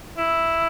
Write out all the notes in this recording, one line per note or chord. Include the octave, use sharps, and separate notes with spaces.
E4